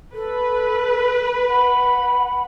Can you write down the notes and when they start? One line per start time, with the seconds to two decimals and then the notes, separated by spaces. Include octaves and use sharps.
0.14 A4 B4
1.49 F#5 B5